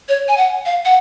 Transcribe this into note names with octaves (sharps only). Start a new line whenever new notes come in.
C#5
G#5
F#5
F5
F#5